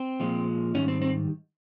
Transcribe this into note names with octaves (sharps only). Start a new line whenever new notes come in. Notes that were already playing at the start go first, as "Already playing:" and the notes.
Already playing: C4
A#2 F3 G#3
G#2 D#3 G3 C#4
C4
C4